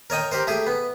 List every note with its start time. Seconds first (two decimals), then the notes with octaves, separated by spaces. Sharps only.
0.10 A#4 C#5 D#5 G5
0.32 G4 A#4 C5
0.47 A3 G4 G#4
0.66 B3